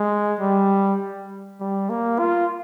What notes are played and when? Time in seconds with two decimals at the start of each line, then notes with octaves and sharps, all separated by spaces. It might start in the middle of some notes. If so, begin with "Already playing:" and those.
Already playing: G#3
0.40 G3
1.60 G3
1.90 A#3
2.19 F4